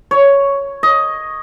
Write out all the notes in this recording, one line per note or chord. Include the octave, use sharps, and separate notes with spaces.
C#5
D#5